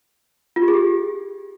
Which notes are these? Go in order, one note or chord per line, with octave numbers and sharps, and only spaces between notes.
F4
G4
G#4
G4